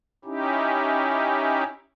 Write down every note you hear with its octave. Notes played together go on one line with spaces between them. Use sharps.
C#4 D#4 E4 G4